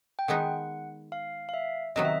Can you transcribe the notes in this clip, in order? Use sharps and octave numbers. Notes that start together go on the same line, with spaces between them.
G5
D#3 G#3 B3 D#4 F#5
F5
F5
E5
C3 D#3 F#3 B3 D#5
E5